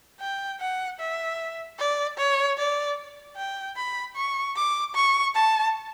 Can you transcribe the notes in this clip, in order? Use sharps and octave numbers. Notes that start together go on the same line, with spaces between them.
G5
F#5
E5
D5
C#5
D5
G5
B5
C#6
D6
C#6
A5